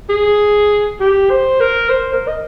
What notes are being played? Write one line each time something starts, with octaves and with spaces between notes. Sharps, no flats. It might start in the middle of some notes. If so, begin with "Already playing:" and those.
G#4
G4
C5
A#4
C5
A#4
D#5